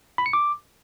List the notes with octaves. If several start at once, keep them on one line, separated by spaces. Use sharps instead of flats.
B5
C#7
D6